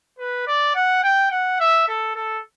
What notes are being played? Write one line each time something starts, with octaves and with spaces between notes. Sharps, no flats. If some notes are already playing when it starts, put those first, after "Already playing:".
B4
D5
F#5
G5
F#5
E5
A4
A4